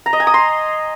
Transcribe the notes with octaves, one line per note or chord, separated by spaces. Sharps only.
A#5
D#5
G#5
D#6
C6